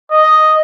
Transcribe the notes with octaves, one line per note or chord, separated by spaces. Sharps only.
D#5